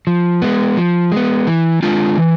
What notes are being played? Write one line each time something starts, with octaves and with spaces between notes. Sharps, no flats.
F3
G#3 B3
F3
G#3 B3
E3
G#3 D4 F4
E3